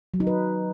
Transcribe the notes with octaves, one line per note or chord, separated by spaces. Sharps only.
F#3
D#4
B4